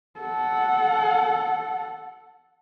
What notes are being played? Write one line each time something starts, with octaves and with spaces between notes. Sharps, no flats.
A4 F#5